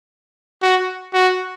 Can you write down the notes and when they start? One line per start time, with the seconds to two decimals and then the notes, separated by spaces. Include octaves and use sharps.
0.62 F#4
1.13 F#4